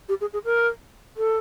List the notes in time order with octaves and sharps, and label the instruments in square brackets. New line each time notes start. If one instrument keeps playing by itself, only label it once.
[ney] G4
G#4
G#4
A#4
A4